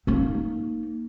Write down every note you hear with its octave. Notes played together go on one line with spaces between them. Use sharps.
A#3 D#4